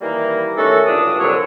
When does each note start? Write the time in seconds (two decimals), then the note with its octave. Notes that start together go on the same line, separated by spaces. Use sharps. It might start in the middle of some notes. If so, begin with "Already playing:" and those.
0.01 D#3 E3 G3 A#3
0.57 D#3 A3 C#4 F#4 A4
0.86 C#2 G2 D3 D4 D#6
1.19 C2 F2 A#2 D3 F#3 C#5